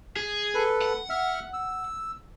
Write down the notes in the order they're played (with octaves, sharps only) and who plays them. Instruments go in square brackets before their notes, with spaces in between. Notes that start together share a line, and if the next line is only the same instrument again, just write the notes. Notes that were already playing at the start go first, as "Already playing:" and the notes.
[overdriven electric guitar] G#4
[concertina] A4 B4
[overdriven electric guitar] F#5
[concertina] E5 F6
E6